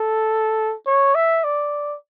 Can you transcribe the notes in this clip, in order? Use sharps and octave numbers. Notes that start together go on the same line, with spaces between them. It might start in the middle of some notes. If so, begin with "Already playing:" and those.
Already playing: A4
C#5
E5
D5